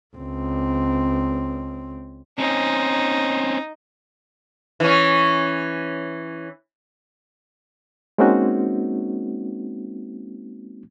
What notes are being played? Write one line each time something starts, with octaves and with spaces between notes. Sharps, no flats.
C#2 C4
C4 C#4 D#4
E3 C#4
G#3 A#3 C4 C#4 D#4 F#4